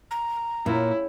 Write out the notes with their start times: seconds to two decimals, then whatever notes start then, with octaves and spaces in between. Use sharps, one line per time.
0.11 A#5
0.66 A#2 C#3 E4 C#5 G5